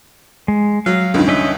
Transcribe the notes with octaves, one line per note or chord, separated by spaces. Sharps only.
G#3
F#3 F5
C#2 G2 D#3
C#4 D#5 E5